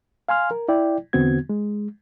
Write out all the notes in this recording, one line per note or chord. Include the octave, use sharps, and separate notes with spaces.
F5 G#5 C6 F6
A#4
E4 D5 G5
E2 D3 B3 C4 F#4 G#6
G#3